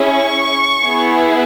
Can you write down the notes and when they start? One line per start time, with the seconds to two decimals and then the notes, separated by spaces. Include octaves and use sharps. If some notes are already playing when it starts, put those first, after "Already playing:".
Already playing: C#4 E4 G#4
0.08 C#6
0.83 B3 E4 G#4